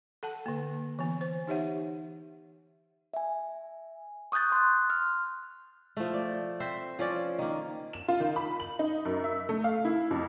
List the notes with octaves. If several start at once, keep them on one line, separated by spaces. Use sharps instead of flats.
A4 F#5 A5
D3 A#3
E3 B3
C5
D#4 G4 C#5 E5 F#5
E5 G#5
C#6 D#6 F#6 G6 A6
C6 F#6
F6
F3 A3
D5
C4 C5 E5
F3 C#4 D5
D#3 A#3
E7
F4
D#3
B5
F#7
D#4
F#2
E5
A3
F5
E4
F2